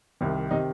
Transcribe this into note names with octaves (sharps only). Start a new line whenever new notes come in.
C2 C3 D#3
C3 D#3 D#4